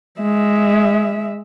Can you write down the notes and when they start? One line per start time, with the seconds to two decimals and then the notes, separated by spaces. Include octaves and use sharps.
0.20 G#3 E5